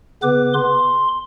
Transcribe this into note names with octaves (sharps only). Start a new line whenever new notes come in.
C#3 B3 B4 D6
C6